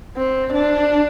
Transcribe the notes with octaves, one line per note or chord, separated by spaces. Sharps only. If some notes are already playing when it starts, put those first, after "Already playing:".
C4
D4